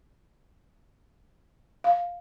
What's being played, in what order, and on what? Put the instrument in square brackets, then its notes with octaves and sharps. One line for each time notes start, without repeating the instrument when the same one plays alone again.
[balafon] F5